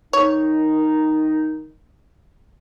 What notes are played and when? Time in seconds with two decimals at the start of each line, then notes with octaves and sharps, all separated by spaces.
0.13 D#3 D#4 C#5